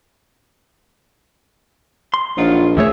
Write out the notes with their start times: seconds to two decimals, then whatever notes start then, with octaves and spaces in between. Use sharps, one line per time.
2.14 C6
2.37 A#1 F#3 D#4 F4
2.77 D#2 A3 G#4 C#5 E5